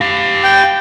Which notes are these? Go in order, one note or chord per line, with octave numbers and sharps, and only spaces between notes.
G4 F5
G5